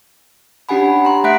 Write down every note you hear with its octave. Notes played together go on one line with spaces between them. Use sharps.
C#4 D4 G4 F#5 G#5 B5
D4
A#5 C6
A3 E5 F#5 F#6 B6 D7